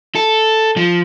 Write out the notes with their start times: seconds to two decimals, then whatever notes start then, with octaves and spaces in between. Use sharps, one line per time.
0.15 A4
0.77 F3